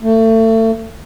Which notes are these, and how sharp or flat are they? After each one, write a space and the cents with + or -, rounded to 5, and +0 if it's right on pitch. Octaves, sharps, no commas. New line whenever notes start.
A3 +30